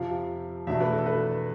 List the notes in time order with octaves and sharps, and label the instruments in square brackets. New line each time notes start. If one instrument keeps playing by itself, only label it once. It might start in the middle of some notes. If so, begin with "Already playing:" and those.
Already playing: [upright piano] F2 C3 F3 F5
E2 B2 A3 D4 E5
B4
A4
B4